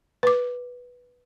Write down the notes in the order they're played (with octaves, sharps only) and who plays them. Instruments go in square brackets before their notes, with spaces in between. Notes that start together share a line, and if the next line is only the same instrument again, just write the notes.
[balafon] B4 D6